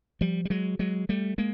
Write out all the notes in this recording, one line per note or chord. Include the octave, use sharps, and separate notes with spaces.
F3 G3
G3
F#3 G#3
F#3 G#3
G3 A3
G#3 A#3